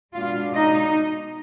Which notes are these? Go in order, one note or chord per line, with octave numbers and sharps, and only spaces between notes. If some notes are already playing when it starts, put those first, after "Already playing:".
B2 G#3 D4 F4 F5
D#4 D#5